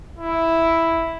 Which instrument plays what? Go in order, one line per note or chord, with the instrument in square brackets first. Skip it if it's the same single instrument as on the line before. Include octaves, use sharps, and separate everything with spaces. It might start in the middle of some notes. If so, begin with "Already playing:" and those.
[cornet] E4